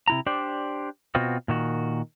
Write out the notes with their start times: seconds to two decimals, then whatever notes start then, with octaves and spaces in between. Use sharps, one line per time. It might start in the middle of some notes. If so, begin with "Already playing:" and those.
0.08 C3 E4 A#5
0.26 D4 G4 C5 D5
1.15 B2 B3 C4 F4 F#4
1.48 A#2 D#3 F#4